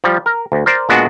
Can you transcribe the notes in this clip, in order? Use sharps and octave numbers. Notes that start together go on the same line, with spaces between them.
F3 G3
A#4
D2
A#4 C5 D5
A#2 G#3 B3 D4 F#4